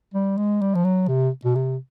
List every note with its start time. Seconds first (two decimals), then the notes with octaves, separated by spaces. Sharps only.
0.14 G3
0.37 G#3
0.62 G3
0.75 F3
0.85 F#3
1.08 C3
1.45 B2
1.55 C3